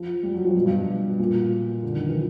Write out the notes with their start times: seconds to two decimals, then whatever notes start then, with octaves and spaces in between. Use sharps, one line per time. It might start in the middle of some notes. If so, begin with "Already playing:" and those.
Already playing: F3
0.23 G3
0.34 F#3
0.45 F3
0.56 B2
0.66 G2
1.19 A#2
1.83 D3
1.94 D#3
2.09 E3
2.15 F3